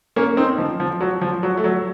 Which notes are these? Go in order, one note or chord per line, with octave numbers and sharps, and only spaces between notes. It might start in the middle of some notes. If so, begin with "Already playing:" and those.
A#3 C#4
C4 D#4
F3
F3
F#3
F3
F#3
A3
F#3